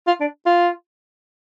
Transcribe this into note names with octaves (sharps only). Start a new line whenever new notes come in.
F4
D4
F4